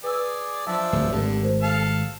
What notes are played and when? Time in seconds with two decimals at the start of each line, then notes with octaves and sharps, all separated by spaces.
0.04 G#4 B4 D5 E6
0.67 F3 F#3 D4 E5
0.93 D1 A3
1.12 G#1 D3 G4
1.43 A#4 C5
1.62 A4 F5 A5